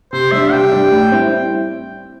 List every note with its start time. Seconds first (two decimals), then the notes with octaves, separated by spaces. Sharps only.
0.13 C3 C5
0.32 G3 D4 E5
0.52 C3 G5
0.72 G3 D4
0.91 A2
1.11 G3 C4 E4